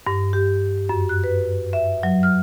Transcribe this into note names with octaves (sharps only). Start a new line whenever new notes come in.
G2
G4
F#2
F#6
B4
E5
F#3
F6